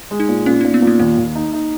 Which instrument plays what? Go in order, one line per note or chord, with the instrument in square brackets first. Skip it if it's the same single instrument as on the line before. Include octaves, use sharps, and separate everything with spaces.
[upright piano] G#3
[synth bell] D#4
[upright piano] A#2
[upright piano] A#2 [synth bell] C#4
[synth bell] D#4
[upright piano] A#2
[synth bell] B3
[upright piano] A#2
[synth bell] A#3
[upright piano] D#2 [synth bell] A#3
[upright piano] D#2
D#4
D#4